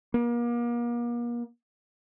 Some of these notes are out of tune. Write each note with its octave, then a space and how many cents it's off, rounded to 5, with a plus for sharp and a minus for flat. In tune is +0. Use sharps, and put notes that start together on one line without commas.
A#3 +40